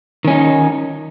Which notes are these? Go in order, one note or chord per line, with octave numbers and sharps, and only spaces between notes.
D#3 C#4 D#4